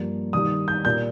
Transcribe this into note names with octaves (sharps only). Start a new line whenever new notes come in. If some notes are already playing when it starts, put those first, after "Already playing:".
Already playing: G2 F3 A#3
G2 D#3 G3 D#6
G6
A#2 G3 A#3 G6